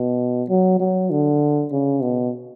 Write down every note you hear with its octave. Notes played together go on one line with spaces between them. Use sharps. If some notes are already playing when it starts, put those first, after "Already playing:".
Already playing: B2
F#3
F#3
D3
C#3
B2